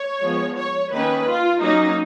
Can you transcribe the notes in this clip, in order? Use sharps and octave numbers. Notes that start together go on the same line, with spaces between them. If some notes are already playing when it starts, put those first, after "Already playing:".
Already playing: C#5
F3 G#3 B3
C#5
D#3 A#3 C#4 B4
F4
F#3 A#3 C#4 D#4